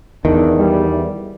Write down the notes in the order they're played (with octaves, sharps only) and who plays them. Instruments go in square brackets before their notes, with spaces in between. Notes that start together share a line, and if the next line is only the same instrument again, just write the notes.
[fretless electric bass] E2 [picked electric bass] D#3 [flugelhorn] D4
[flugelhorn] G3